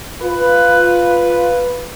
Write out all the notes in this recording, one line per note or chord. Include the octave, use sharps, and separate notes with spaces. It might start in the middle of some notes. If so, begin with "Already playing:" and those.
F4 B4